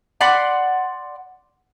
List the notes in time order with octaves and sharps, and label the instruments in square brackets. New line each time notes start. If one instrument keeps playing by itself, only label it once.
[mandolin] D5 F#5 B5 C6